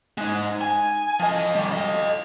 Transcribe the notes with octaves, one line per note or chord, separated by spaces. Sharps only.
G#3 D#4
G#5
F3 D#5
D#3 G3
A4 D#5